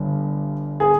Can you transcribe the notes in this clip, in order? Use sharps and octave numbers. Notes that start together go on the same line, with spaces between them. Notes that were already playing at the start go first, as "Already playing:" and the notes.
Already playing: G1 G2
G#4